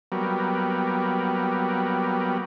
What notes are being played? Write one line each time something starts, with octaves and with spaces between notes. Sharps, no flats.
F#3 G3 A#3 B3